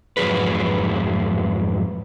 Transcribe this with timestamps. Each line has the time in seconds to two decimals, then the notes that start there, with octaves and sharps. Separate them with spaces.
0.17 F2 G#2 F#3 G#4 B4